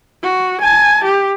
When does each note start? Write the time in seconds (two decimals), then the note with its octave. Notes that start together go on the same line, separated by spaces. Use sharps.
0.23 F#4
0.61 G#5 A5
1.04 G4